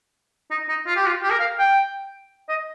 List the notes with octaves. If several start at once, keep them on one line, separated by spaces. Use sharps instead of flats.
D#4
D#4
F4
G4
F4
G4
A#4
F5
G5
D#5